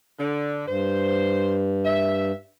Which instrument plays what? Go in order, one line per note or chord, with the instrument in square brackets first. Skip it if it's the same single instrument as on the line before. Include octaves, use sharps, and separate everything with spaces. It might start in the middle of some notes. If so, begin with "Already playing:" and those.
[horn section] D3
[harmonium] G2 [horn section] C5
[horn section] E5